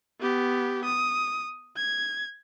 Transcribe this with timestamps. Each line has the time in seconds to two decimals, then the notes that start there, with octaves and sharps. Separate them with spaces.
0.20 B3 G4
0.85 D#6
1.77 G#6